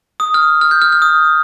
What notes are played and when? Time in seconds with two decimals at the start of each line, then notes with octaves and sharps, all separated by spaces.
0.20 D#6
0.34 F6
0.61 F6
0.71 G6
0.82 F6
0.92 F6
1.02 D#6